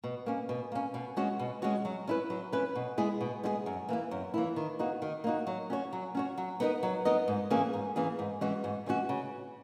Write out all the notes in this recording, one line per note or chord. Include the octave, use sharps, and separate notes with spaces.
B2
A#3 C#4
B2
A#3 C#4
B2
G#3 C#4 F#4 C#5
B2
G#3 C#4 F#4 C#5
F#3
C#4 E4 B4
F#3
C#4 E4 B4
B2
G#3 B3 E4 G#4
B2
G#3 B3 E4 G#4
F#2
E3 A#3 E4
F#2
E3 A#3 E4
D#3
A#3 D#4 F#4
D#3
A#3 D#4 F#4
F#3
C#4 F#4 C#5
F#3
C#4 F#4 C#5
F#3
B3 D#4 A#4 D#5
F#3
B3 D#4 A#4 D#5
G#2
E3 A#3 C#4 G#4
G#2
E3 A#3 C#4 G#4
G#2
E3 G#3 C#4 F#4
G#2
E3 G#3 C#4 F#4
C#3